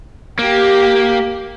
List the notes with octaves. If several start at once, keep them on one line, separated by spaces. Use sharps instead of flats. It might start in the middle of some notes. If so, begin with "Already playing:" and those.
A#3 G4